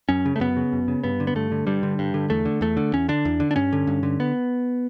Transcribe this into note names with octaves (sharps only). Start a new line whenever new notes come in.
F#2 C#4
C#3
A3
F#2 B3
C#3
F#2
C#3
G2 B3
D3
B3
G2 A3
D3
G2 G3
D3
G2
D3
E2 A3
D3
E2 A3
D3
E2 C#4
D3 D4
E2
D3
D4
G2 C#4
D3
G2
D3
B3